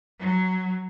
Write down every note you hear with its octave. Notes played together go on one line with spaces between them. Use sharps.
F#3